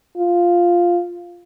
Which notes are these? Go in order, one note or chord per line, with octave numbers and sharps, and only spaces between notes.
F4